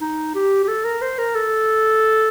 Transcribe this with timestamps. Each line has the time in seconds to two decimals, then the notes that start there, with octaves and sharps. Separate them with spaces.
0.01 D#4
0.35 G4
0.64 G4
0.68 A4
0.85 A#4
1.02 C5
1.18 A#4
1.35 A4